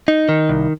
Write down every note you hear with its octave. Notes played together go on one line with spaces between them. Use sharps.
D#4
D#3
C2